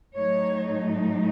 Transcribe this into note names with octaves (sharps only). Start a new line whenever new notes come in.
A2 F#3 A3 D#4 C#5